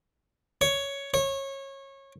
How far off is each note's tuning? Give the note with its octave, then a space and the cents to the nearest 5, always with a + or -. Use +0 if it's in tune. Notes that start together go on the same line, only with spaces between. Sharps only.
C#5 +5
C#5 -25